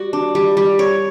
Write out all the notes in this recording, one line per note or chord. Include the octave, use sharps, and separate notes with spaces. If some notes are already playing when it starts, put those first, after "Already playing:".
Already playing: G3 F#4
D4
G3
G3
C#5